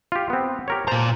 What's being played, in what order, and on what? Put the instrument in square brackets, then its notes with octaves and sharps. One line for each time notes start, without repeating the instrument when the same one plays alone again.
[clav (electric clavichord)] F4 G4
B3 C4
G4 A#4 C#5
[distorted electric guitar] A#2 A#5 [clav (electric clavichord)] C5 A5